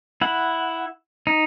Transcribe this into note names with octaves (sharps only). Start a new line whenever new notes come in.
E4 F#5
D#4